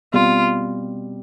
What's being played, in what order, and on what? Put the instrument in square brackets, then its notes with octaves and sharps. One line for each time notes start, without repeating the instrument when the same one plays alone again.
[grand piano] B2 G3 C4 [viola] F4